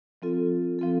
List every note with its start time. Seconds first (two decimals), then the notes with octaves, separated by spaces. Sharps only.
0.22 F3 C4 F4 A4
0.79 F3 C4 F4 A4